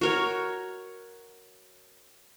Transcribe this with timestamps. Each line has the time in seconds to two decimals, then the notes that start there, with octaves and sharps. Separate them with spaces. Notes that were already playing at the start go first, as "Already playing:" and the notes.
0.01 F#4 A#4 C#5